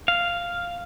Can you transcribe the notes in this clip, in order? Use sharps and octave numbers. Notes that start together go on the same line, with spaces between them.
F5